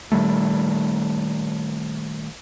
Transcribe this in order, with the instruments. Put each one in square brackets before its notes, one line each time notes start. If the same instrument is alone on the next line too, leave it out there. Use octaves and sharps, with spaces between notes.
[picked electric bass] A#2 D#3 G3 A3